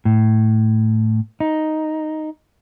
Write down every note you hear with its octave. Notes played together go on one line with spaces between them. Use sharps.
A2
D#4